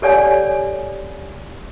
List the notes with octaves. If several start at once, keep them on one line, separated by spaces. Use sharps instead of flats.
G4 A4 C#5 D5 F#5 G#5